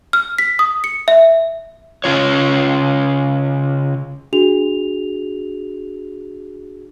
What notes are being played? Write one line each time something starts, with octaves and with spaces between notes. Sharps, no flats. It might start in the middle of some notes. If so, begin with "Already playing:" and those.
F6
B6
D#6
C#7
E5
C#3 C#4 F4 C#5
D4 F#4 G#4 F7